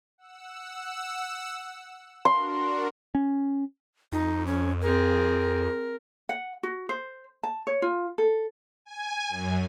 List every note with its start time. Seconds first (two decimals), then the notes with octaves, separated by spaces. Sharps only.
0.18 F#5 E6
2.25 D4 F#4 A#4 C6
3.15 C#4
4.12 F2 D#4
4.47 C#4
4.81 C4 G#4 A#4
6.29 F#5
6.63 F#4
6.89 C5
7.43 A5
7.67 C#5
7.82 F4
8.18 A4
8.85 G#5
9.29 F#2